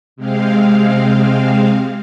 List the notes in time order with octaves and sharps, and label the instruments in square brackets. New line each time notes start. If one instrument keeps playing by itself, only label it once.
[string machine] C3 G#3 C4 F5